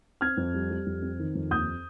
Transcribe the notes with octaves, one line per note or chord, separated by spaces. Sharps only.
C4 F6 G#6
F2
G3
G3
F2
C4
D#3
F2
D#2 D#6 G6